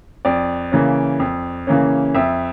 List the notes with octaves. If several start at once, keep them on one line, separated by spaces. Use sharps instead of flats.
F2 D5
C#3 E3 A#3 C#4
F2
C#3 E3 A#3 C#4
F2 E5